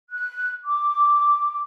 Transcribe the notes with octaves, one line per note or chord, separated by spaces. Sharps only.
F#6
D6